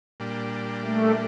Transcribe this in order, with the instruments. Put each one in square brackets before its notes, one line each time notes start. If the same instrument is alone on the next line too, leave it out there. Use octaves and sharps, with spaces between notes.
[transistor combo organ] A#2 G3 D4
[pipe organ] A3